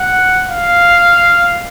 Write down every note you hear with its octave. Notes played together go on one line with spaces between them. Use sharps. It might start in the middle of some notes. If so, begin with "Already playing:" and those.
Already playing: F#5
F5